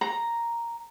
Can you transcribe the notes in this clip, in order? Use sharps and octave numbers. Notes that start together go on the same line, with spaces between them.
A#5